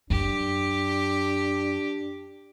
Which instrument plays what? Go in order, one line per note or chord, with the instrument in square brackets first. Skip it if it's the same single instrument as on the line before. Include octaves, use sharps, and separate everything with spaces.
[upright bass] F#2 [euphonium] D4 [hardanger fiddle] G4